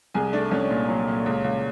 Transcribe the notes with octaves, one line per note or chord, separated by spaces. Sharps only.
C2 G#4 G#5
A3 D4 D5
C2 C#4 C#5
A#2
F#3
A#2
C#2
C#2